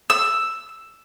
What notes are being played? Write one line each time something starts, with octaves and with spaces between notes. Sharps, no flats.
E6